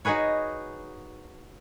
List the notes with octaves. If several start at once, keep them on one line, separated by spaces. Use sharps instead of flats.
D#4 F#4 G#4 B4 C#5